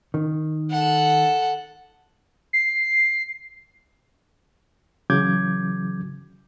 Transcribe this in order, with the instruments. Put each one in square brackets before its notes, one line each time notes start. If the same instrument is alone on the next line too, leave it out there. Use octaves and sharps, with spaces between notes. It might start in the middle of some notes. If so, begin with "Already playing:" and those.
[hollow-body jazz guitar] D#3
[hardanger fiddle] A4 F#5
[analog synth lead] C7
[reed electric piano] C#3 E3 F#3 D6 G6 G#6